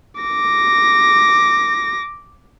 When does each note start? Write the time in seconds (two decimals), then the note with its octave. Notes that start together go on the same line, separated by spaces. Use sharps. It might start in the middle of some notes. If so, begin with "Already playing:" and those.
0.21 D6 A#6